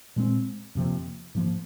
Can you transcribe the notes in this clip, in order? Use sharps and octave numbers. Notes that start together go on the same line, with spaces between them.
A#2 G#3 C4
F2 C3 F3 A#3
G#2 F3 A#3